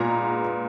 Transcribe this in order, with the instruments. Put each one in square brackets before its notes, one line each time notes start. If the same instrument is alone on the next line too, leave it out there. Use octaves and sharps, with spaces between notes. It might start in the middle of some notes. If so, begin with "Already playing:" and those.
Already playing: [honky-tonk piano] A#2 G#3 B3 A#5